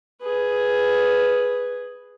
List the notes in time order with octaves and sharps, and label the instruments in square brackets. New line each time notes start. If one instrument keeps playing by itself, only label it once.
[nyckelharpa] G#4 B4